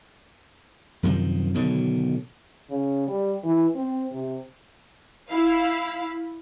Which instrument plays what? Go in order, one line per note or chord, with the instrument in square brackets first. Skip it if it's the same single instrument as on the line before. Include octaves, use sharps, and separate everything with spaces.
[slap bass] F#2 C3 D#3 F3
B2 D3 D#3 F#3
[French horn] C#3
G3
E3
C4
C3
[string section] E4 F5 B5